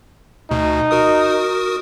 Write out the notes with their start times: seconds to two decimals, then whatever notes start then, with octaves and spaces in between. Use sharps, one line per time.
0.51 D2 B2 D#4
0.91 F#4 A#4 D#6